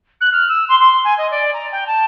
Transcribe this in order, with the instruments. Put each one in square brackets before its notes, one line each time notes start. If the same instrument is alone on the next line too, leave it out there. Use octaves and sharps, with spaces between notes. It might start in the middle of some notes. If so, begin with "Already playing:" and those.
[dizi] F#6
F6
E6
C6
C6
G#5
D#5
D5
A#5
G5
A5